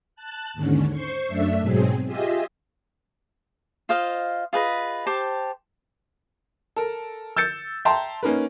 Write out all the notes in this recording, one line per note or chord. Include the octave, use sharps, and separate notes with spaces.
A5 F#6
D#2 G#2 D3 C#4
C5 C6 C#6
F#2 A3 D4 E5
G#2 B2 F#3 C4 G#4
F4 G4 G#4 D#5 E5
F4 C5 D#5 F5
F4 G#4 B4 D#5
G4 C5 A5
A4 A#4
E6 G6 A6 C#7
E5 G5 A5 A#5 C6
A#3 C#4 D#4 A#4 B4